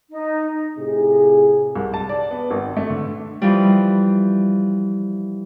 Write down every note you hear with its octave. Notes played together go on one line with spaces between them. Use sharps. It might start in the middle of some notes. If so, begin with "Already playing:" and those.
D#4
A2 C3 G#4
C2
A5
D5
B3
G#1
A3
D3
E3 F3 G3